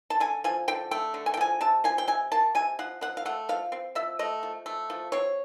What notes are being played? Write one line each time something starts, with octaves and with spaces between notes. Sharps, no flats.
A5
D3 G#5
F3 G#5
D3 G5
A3 G5
D3
G#5
G5
F3 G#5
C3 A5
F3 G#5
G5
C3 G#5
A#3 A5
C3 G#5
F3 F#5
F3 F#5
F5
A3 F#5
F3 F5
C4
F3 E5
A3 D#5
F3
A3
F3
C4 C#5